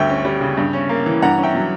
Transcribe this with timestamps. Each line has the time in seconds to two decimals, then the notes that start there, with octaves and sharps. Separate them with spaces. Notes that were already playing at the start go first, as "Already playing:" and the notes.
Already playing: D2 G2 E5 G5
0.09 C#4
0.25 G3
0.41 C#3
0.57 G2
0.73 C#4
0.89 A#3
1.06 E3
1.22 G2 F#5 A#5
1.37 C#4
1.43 E5 G5
1.55 F#3